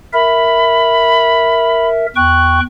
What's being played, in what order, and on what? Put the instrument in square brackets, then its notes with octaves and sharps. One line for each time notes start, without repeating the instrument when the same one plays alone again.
[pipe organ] A#4 E5 [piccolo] B5
[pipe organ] E2 G5 C#6 [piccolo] F#6